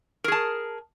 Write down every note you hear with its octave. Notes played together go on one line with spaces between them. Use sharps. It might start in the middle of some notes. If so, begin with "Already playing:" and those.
G#4 A#4 A5